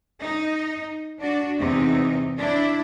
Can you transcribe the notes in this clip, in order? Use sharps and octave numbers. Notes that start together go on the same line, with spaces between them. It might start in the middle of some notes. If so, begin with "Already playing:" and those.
D#4
D4 F#4
E2 C3 D#4
D4 E4